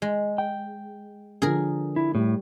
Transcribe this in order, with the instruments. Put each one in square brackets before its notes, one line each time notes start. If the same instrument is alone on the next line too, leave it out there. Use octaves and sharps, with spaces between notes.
[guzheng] G#3
[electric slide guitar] G5
[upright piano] D3 F3 [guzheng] G#4 A#4
[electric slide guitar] E4
[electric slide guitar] A2 [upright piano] G3